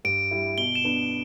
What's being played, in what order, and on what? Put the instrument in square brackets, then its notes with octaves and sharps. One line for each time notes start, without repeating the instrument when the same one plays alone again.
[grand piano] G2 [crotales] D7
[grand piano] G3 E4
[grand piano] B2 [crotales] G7
[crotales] E7
[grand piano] B3 D4